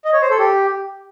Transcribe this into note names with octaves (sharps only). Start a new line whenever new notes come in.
D#5
C#5
C5
A4
G4